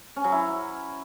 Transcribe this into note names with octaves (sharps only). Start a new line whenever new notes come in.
C#4
F#3
E4